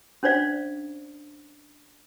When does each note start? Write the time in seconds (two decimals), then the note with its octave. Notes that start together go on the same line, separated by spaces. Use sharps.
0.23 C#4 D4 C5 D5 F5